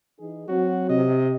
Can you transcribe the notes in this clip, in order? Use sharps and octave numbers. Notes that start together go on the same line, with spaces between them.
E3 D#4 G#4
F#3 C4 F#4
C3 D#5